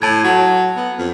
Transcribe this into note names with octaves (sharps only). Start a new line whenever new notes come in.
A2 A5 G#6
F#3
B3
F2